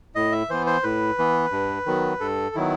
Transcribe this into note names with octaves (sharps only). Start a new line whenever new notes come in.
A2 D#5
E5
E3 B3 C5
C5
A2 B4
E3 B3
G2
D#3 F#3 B3
G2 A4
D#3 F#3 B3 E4